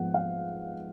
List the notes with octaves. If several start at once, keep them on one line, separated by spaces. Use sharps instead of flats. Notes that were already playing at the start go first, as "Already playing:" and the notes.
Already playing: G#2 F3 G#3 B3 F#5
F5